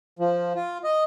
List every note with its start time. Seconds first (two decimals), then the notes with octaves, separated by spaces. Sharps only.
0.19 F3
0.55 F4
0.84 D#5